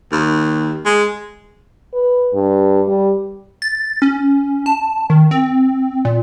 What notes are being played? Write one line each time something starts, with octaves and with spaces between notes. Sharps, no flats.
D#2
G#3
B4
G2
G3
A6
C#4
A5
D#3
C4
A#2